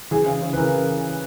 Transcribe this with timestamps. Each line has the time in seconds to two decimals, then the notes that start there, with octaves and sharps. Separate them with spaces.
0.11 E3 G#4
0.26 C#3
0.42 C#3
0.53 B4
0.57 E3 A#4